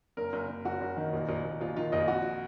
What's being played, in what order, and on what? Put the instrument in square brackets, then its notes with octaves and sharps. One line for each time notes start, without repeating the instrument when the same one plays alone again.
[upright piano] F#1 A#4
F#1
F#1
F#1 F#4
F#1
D#3
A#1
A#1
A#1
A#1 F4
D#3 F4
A#1 D#5
F2 F#4